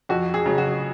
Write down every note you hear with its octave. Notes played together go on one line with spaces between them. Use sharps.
F2 F#4
G#4
C#3 F#3
F#4